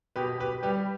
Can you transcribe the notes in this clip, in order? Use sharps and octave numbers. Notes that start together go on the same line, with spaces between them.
B2 G4 B4
G4 B4
G3 G4 B4